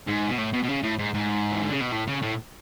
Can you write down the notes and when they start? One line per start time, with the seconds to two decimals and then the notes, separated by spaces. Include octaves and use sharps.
0.07 G#2
0.29 B2
0.38 A2
0.54 B2
0.64 B2
0.69 C#3
0.83 A2
0.99 G#2
1.14 G#2
1.52 E3
1.62 D3
1.72 C#3
1.81 B2
1.92 A2
2.08 C#3
2.23 A2